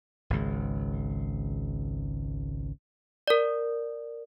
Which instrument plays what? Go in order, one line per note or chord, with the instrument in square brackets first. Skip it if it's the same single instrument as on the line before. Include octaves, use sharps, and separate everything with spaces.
[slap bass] G#1 C#2
[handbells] A#4 D5